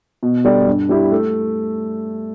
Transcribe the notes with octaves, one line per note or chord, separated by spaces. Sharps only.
B2
G3 D4 A4 D5
G2
G3 E4 G4
A3